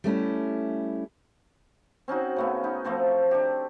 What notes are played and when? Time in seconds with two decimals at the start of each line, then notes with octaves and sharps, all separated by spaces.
0.04 G3 A3 C#4 E4
2.08 C4 C#4 D#4 F#4
2.36 C#3 A3 B3
2.64 D#4 B4
2.84 F3 A3 C4 A4
3.31 D4 G4